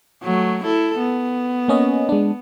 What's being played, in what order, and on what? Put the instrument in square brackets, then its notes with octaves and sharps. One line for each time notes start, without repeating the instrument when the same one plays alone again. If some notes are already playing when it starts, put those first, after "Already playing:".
[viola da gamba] F#3 A3
E4 A4
B3
[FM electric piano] A#3 C#4 D#5
G#3 D4